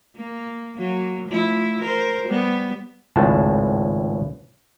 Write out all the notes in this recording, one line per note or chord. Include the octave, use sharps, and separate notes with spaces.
A#3
F#3 A#3
F3 A3 E4
A#4 C5
G3 B3
G#1 C#2 A2 A5